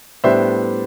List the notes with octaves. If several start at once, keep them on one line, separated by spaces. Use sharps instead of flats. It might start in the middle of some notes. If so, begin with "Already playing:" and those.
A2 G3 B3 D4 C5 E5